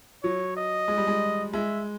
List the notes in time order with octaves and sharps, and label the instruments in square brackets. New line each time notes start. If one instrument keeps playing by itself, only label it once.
[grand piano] F#3 [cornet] C#5
[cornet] D#5
[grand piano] G#3
G3
G#3
[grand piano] G#3 [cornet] E5